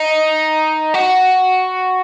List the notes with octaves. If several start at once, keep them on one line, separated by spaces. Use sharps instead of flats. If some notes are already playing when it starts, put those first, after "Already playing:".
Already playing: D#4
F#4